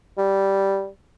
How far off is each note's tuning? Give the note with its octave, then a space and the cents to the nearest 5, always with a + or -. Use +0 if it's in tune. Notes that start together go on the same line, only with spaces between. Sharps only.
G3 -5